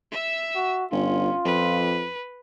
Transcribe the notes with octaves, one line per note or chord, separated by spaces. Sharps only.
E5 E6
F#4
G1 C#4 F4
F2 B4